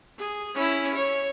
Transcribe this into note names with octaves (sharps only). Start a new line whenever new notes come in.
G#4
C#4 E4
C#5